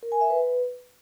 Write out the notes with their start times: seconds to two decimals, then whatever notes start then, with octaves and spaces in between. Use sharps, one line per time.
0.03 A#4
0.12 G#5
0.21 E5
0.30 B4